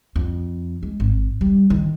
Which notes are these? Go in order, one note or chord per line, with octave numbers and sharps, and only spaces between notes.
F2
G#3
G#1
G3
D#3